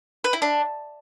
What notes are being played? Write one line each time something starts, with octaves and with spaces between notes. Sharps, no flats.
B4
E4
D4